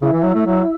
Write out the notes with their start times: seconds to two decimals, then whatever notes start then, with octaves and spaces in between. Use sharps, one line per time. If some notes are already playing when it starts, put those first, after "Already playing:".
0.02 C#3 E4
0.13 E3
0.23 F#3
0.35 A3
0.46 F#3